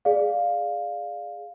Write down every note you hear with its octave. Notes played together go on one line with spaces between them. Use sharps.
G#4 D5 F5